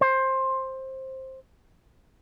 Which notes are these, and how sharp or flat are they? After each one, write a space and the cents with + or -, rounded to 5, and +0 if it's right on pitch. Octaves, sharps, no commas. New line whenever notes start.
C5 +15